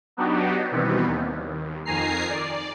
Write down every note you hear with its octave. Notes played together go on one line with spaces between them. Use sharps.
F#3 B3 D4 D#4 F#4 G4
B2 D#3 E3 G3 B3 C4
D#2
F2 D#3 G#5 A#5 C7
D5